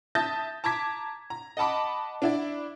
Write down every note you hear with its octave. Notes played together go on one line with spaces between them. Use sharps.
E5 A5 D#6 G6 A6 A#6
A5 A#5 D6 G#6 B6
A#5
D#5 F#5 A5 B5 D6
D4 E4 D5